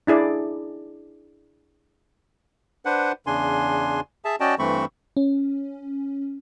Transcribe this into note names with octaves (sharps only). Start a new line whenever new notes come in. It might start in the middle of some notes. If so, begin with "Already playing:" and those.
D4 E4 G#4 D5
D4 B4 C5 F#5
E2 C#3 D4 G#5 C6
G#4 E5 A5
C#4 F#4 D5 D#5 G5 A5
G2 E3 A3 C4 B5 C#6
C#4